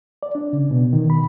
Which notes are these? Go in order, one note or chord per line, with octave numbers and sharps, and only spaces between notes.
D5
D4
C#3
B2
D#3
B5